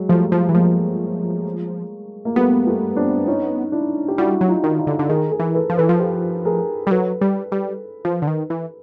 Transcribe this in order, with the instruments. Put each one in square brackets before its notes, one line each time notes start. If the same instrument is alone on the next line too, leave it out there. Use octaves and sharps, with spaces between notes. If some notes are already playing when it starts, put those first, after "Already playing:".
Already playing: [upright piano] F#3 G#3
[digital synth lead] F3 [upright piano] G3 A3
[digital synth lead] F3
E3
[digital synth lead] F3 [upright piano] G#3 A#3
[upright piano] A#3
[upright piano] G3 A3 [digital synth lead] B3
[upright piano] G3 A3
C4 D4
C#4 D#4
D4 E4
G4
[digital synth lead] G3 [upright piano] E4 F#4
[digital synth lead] F#3
[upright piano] D#4 F4
[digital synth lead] D#3
[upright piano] D#4 F4
[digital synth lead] D3
D3
[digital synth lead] D#3 [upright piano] G#4 A#4
[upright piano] G#4 A#4
[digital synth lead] E3
[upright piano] A4 B4
[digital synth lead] F3
[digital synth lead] E3 [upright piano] A4 B4
[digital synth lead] F3
[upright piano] G4 A4
G#4 A#4
[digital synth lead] G3
[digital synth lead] F#3 [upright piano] A4 B4
[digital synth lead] G3
G3
F3
D3
D#3
E3